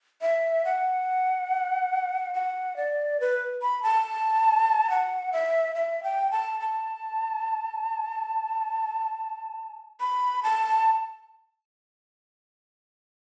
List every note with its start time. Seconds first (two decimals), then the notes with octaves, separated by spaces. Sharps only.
0.22 E5
0.65 F#5
2.34 F#5
2.77 D5
3.20 B4
3.62 B5
3.83 A5
4.90 F#5
5.33 E5
5.75 E5
6.03 G5
6.31 A5
6.60 A5
10.00 B5
10.43 A5